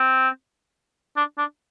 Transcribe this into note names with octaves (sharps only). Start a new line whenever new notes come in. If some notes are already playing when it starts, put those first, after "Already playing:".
Already playing: C4
D4
D4